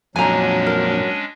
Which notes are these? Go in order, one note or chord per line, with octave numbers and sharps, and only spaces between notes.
F2 A#2 F#3 G#3 C#4 D4 G#5 A#5
A#4